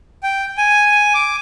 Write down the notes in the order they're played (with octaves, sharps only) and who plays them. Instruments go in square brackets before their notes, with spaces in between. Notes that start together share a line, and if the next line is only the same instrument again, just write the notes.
[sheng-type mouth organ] G5
G#5
D6